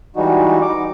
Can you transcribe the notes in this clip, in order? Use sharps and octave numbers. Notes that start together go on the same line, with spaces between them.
E3 G3 G#3 D#4 F#4
D#4 D6